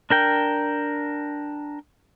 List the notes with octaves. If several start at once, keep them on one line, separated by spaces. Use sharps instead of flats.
D4 A#4 G5